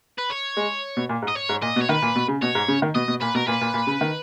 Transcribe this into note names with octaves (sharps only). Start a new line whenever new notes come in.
B4
C#5
G#3
B2
A#2
G#2
D#5
C#5
G#2
A#2 D#5
B2
C#5
D#3 B4
A#2
B2
C#3
B2 C#5
G#2
C#3
D#3
B2 D#5
B2
A#2 B4
B2 A#4
A#2 B4
A#2
A#2
C#3
D#3